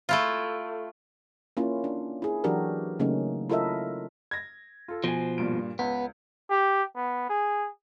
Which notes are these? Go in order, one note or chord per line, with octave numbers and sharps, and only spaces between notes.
A3 E4 F4
A#3 C#4 E4 F4
D4
E4 G#4
E3 F#3 D4 F#4 G4 A#4
C#3 F#3 A3 A#3 C#4 D#4
E4 F4 A4 A#4 D#5 E5
G#6 A#6
F4 A4
B2 F3 C5 G#5
G2 A#2 D7
C#2 B3
G4
B3
G#4